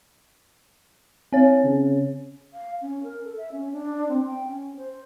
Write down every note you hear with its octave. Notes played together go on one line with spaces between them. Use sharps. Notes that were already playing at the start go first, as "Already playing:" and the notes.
C4 C#5
C#3
F5
C#4
A#4
A4
E5
C#4
D4
C4
G5
C#4
C5